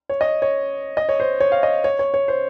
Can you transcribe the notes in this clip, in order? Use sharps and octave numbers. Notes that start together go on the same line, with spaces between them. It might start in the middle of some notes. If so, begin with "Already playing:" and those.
C#5
D#5
C#5
D#5
C#5
C5
C#5
F5
D#5
C#5
C#5
C#5
C5